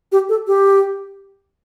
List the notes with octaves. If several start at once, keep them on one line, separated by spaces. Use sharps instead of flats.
G4
A4
G4